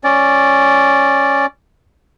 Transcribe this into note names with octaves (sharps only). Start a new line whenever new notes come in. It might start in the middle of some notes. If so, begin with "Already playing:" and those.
C#4 D5